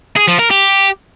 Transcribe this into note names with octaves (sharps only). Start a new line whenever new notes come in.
G#4
F3
A#4
G4